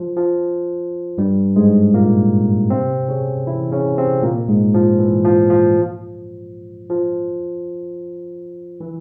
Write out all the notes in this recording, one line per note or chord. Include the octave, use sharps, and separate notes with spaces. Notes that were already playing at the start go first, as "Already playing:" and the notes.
Already playing: F3
F3
G2 G3
G#2 G#3
A#2 A#3
C3 C4
C#3 C#4
E3 E4
C#3 C#4
C3 C4
A#2 A#3
G#2 G#3
F3
E3
F3
F3
F3
E3